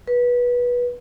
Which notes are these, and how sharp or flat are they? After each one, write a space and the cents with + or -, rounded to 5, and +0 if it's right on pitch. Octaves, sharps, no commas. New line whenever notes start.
B4 -20